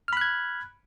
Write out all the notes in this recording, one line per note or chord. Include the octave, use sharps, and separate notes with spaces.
B5 F6 F#6 G#6